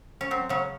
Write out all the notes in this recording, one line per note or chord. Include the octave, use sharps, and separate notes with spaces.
C#4
F#3 C4
C#3 F#3 C#4